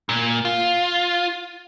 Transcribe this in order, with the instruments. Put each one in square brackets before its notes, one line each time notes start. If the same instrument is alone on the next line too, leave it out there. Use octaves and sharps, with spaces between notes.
[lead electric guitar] A#2
F4